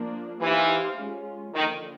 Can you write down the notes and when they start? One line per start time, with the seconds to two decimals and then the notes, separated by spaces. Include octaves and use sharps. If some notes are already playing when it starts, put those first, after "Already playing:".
Already playing: F3 A#3 D4
0.41 E3 D#4 G4 C5 F5
0.97 G#3 C#4 F4
1.53 D3 D#3 F3 A#3